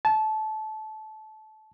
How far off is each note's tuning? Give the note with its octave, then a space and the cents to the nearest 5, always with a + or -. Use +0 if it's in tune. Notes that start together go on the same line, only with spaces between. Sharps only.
A5 -20